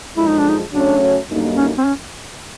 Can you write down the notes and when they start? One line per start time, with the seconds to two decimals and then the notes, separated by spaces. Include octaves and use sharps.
0.17 F#2 D3 F3 G#3 E4
0.27 D#4
0.38 D4
0.49 D#4
0.72 C#3 F#3 A3 C#4 D4 F#4
1.29 F#2 D3 G3 A#3 D#4
1.57 C#4
1.78 C4
1.85 C#4